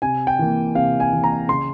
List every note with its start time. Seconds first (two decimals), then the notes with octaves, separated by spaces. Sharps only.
0.02 C3 G#5
0.27 G5
0.39 E3 A#3
0.75 C3 F5
1.00 G#5
1.13 E3 A#3
1.24 A#5
1.48 C#3 C6